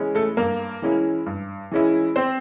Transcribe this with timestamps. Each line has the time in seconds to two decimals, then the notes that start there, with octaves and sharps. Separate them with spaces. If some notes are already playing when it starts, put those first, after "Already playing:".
Already playing: E3 G#3 C#4 E4
0.15 A3 A4
0.37 G2 A#3 A#4
0.82 E3 G#3 C#4 E4
1.26 G2
1.72 E3 G#3 C#4 E4
2.16 C4 C5